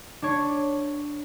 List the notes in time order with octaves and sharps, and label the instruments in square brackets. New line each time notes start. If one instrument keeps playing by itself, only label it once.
[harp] D4 C#5